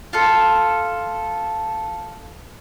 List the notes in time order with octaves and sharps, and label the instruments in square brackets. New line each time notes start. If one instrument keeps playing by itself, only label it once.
[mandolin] F4 A4